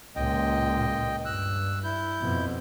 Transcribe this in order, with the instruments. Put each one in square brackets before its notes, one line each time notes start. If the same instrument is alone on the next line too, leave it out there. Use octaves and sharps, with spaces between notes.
[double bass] C#2 A#2 [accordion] D#5 G5
[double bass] G2 [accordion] E6 F#6
[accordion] E4 G6
[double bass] F2 B2